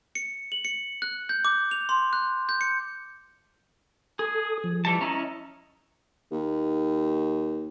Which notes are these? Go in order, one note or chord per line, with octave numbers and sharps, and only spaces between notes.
C#7
F#7
C#7
F#6
G6
D6
F7
C6
F#6
G6
C#7
G#4 A4 D#6
F3
E3 G3 A5
C#4 E4 D#5 A#5
D#2